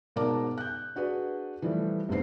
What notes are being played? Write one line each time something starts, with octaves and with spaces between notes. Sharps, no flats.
G#2 B2 A#4 D5 A5 D6
F#6 G6
D4 F#4 G#4 B4 D5
E3 F3 G3 A3
F1 G#2 B3 C4 C7